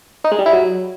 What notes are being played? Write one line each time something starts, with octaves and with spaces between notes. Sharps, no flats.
D#4
G#3
G3
E4
F#3